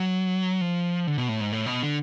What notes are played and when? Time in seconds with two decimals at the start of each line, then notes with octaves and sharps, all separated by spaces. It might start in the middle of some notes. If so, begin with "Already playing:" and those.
Already playing: F#3
0.61 F3
1.07 D3
1.18 B2
1.29 A2
1.40 G#2
1.52 A2
1.66 B2
1.82 D3